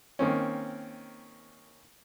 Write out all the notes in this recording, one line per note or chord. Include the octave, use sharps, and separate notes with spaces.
D#3 A#3 C4 C#4